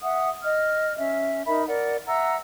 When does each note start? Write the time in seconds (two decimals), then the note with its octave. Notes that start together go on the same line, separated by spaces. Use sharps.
0.02 E5 F#5 D#6
0.43 D#5 F6
0.98 C#4 E5
1.46 D#4 A#4 E5 B5
1.67 A#4 D5 F#5
2.06 E5 F#5 A#5 E6